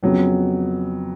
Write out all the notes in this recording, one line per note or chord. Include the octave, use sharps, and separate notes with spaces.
F2 C#3 F#3 B3